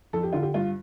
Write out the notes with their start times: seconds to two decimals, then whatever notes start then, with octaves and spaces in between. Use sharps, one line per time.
0.13 F2 A4
0.23 G4
0.33 D3 F4
0.43 G4
0.54 G2 F4